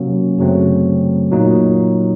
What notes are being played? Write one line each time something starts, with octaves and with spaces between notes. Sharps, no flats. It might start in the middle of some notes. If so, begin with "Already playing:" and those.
Already playing: C3 F#3 A#3 C#4
F#2 C#3 F#3 A3 C4
A#2 F#3 A#3 D#4